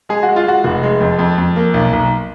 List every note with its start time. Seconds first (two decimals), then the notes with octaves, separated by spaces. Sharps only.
0.09 G#3 G#4
0.23 F#4
0.28 G#3
0.36 F4
0.46 G#3 F#4
0.64 F1
0.83 G#3
1.00 F2
1.19 F2
1.38 F2
1.56 A#3
1.74 B1
1.93 B1